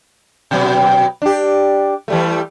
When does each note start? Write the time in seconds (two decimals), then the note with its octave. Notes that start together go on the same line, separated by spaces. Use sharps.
0.51 B2 F#3 B3
1.22 D4 G4
2.08 E3 G3 A3